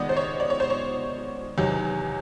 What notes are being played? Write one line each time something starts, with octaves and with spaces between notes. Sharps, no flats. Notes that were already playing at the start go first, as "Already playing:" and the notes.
Already playing: D#3 G#3 B3 D5 D#5
C5
C#5
D5
C#5
C5
C#5
E2 C3 D#3 F#3